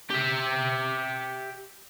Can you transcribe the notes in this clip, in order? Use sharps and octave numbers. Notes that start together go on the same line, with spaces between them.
G4 E5